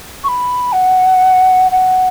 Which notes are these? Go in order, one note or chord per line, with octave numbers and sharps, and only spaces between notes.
C#6
B5
F#5
F#5